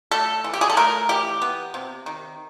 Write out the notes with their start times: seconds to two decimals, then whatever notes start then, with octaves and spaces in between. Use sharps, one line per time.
0.11 A3 A4
0.44 E3
0.54 G4
0.61 G#4
0.70 A4
0.77 A3 A#4
1.09 E3 G4
1.42 B3
1.74 C3
2.06 D#3